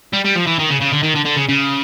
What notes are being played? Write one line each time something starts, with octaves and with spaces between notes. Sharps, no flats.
G3
G3
F3
E3
D#3
C#3
C#3
D3
D#3
D3
D3
C#3
C#3